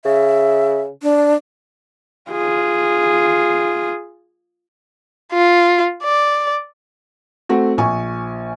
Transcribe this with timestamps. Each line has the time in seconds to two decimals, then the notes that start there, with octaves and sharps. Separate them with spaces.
0.05 C#3 E5
1.03 D4
2.31 F4 G#4
5.33 F4
6.04 D5
7.49 A3 C4 F#4
7.78 A#1 G#5 C#6